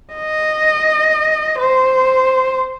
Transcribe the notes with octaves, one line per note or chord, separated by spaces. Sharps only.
D#5
C5